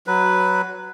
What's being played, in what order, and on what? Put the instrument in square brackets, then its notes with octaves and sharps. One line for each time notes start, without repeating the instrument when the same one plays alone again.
[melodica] F#3 B4